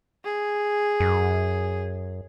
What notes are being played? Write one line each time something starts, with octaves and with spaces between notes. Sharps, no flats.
G#4
F#2